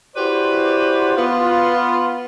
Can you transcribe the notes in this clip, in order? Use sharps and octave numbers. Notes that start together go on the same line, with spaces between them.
E4 F#4 G4 B4 C5 D5
B3 F4